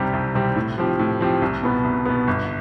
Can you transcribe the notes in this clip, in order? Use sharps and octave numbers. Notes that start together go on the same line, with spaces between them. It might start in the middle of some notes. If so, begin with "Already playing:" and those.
Already playing: C2 C3 G3 C4 G4
C2
C3 G3 C4 G4
A2
F3 C4 G4
A2
F3 C4 G4
C2
B2 B3
C2
B2 B3
G1